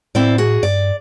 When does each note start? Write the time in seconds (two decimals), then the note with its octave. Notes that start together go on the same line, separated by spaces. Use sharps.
0.15 A2 C4 E4 D5
0.38 F#4 G#4
0.63 G2 D5